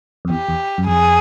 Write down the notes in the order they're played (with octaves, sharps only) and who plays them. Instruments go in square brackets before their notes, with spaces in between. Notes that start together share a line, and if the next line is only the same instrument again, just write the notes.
[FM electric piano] F2
[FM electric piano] E2 [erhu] G4
[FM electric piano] E2
F#2
[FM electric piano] F2 [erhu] G#4